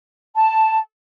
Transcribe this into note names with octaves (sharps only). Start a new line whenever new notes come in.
A5